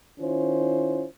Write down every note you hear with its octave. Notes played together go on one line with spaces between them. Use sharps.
D#3 C#4 E4 F4 C5